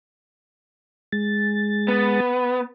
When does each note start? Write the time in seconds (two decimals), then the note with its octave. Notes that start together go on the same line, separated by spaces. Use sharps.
1.12 G#3 A6
1.88 B3